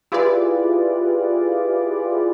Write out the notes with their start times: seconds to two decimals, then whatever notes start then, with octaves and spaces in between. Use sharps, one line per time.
0.12 E4 F4 G4 G#4 B4 D5